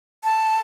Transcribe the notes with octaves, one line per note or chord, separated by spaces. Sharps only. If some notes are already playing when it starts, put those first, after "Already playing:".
A5